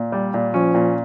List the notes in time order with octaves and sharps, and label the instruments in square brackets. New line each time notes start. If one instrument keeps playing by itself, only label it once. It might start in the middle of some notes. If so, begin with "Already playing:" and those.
Already playing: [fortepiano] A#2
G3
A#2
[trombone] F3 [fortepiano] C#4
[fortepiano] A#2